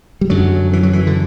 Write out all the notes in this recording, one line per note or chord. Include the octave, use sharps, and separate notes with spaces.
G3
F#2 D3 F#3
E3
F#3
E3
D3